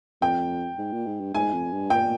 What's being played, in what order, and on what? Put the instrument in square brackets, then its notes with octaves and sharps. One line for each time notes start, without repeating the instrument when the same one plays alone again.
[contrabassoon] F2 [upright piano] G5
[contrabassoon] G#2
A#2
G#2
G2
[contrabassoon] G#2 [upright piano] G#5
[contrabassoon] F2
G2
[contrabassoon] A#2 [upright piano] G5